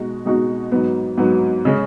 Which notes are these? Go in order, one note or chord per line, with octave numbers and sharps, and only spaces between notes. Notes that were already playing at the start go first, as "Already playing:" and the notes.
Already playing: B2 G#3 D#4 F#4
B2 G#3 D#4 F#4
G#2 F#3 B3
G#2 F#3 B3
C#3 G#3 C#4